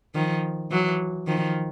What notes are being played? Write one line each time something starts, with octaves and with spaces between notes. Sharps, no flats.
D#3 F3
E3 F#3
D#3 F3